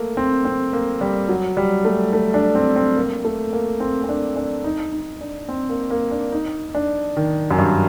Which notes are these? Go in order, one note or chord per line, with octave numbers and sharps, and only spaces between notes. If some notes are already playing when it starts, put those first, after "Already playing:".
Already playing: A3 A#3
C4
C4
A#3
G3
F#3
G3
A3
A3
D4
C4
C4
A#3
A3
A#3
C4
C4
D4
D4
D#4
D#4
D4
C4
A#3
A#3
D4
D#4
D4
D#3
F#2
G2